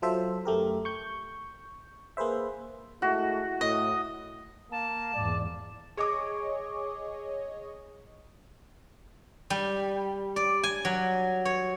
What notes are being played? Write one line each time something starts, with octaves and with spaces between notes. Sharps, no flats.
F#3 F4 A4 C5 E5
F#2 A3 G4 A#4
C#6 G6
A#3 G#4 B4 C5 E5
G#3 A3 E4 F#4
A2 D#5
A#3 A5
E2 G#2 D5
G#4 C#5 D#5 C#6 D6
G3
D5
G#5
F#3
C#5